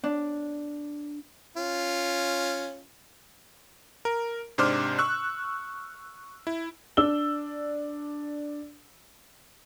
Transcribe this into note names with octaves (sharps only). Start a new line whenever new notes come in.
D4
C#4 F4
A#4
G#2 C3 D4 C5 D6 F6
C#6 E6 F#6
E4
D4 D5 E6 G7